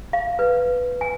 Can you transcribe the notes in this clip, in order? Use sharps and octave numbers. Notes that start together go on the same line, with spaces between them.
F5
B4
G#5